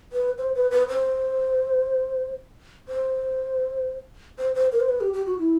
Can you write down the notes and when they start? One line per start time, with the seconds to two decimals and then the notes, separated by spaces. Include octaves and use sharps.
0.13 B4
0.38 C5
0.56 B4
0.71 B4
0.89 C5
2.89 C5
4.39 C5
4.55 C5
4.72 A#4
4.80 C5
4.89 B4
5.01 G4
5.13 G4
5.26 F#4
5.39 E4